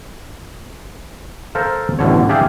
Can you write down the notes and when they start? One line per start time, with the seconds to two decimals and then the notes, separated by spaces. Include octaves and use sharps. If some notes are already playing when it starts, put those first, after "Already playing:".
1.55 A4 A#4 C5 F5
1.99 A1 B2 D3 C#5
2.29 D4 G4 G#4 E5 F5